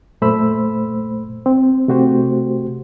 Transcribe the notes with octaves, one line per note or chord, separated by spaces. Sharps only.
F#2 A#2 A3 C5 B5 E6
C4
C3 A3 F#4 G4 C5